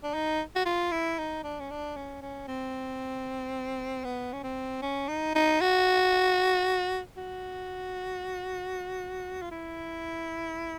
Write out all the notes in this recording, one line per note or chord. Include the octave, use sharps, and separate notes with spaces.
D4
D#4
F#4
F4
E4
D#4
D4
C#4
D4
C#4
C#4
C4
B3
C#4
C4
C#4
D#4
D#4
F#4
F#4
F4
E4